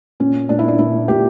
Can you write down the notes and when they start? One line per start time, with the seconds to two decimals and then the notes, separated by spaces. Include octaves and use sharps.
0.20 A#2 C#4
0.49 A#2 D4
0.59 E4
0.68 D4
0.79 A#2 E4
1.08 A#2 G4